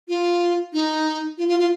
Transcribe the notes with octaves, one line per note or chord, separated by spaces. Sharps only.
F4
D#4
F4
F4
F4